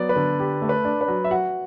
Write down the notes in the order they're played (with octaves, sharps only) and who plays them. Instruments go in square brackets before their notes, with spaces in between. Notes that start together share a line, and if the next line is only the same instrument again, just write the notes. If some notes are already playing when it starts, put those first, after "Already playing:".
Already playing: [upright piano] F#3 B3 [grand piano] D5
[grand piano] B4
[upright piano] D3
G4
A3
[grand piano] B4
[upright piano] D4
[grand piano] B4
[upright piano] F#3
[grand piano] E5
[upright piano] F#4 [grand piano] F#5